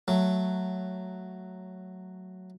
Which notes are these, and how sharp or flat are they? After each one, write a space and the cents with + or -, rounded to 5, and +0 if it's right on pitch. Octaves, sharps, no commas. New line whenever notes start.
F#3 +0 A3 +0